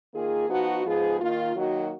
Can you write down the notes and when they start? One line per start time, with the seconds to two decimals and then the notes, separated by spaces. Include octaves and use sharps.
0.13 D#3 A#3 F4 G#4
0.49 F3 B3 D#4 F#4
0.84 G#2 F3 B3 F4 G#4
1.20 D#3 A#3 F4
1.56 D#3 F#3 A#3 D#4 F#4